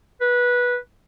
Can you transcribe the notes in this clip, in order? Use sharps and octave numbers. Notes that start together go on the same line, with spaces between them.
B4